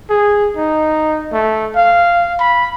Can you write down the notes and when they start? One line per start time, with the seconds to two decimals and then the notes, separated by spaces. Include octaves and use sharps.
0.10 G#4
0.57 D#4
1.33 A3
1.76 F5
2.40 B5